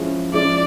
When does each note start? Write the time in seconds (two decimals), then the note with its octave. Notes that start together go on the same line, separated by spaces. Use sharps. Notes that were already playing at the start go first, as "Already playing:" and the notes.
Already playing: F3 G#3 C#4 E4
0.33 F3 G#3 C#4 E4 D5